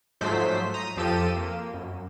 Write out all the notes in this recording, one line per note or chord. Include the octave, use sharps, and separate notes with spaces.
G#2 F3 F#3 A3 C5 B6
A#5 D#6
F2 F3 G4 A4 E6 D#7
A#3
F#2